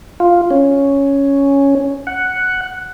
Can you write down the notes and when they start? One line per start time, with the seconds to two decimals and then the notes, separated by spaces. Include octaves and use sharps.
0.20 F4
0.50 C#4
2.07 F#5